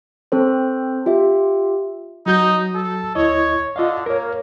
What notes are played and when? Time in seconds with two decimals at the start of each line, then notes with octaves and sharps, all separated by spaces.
0.32 C4 A4 C5
1.06 F4 G4 E5
2.26 F#3 D#4 F#4 G6
2.75 A4
3.15 D2 E4 C#5 D#5
3.76 D3 F4 D#5 F5
4.06 A#3 A#4 C#5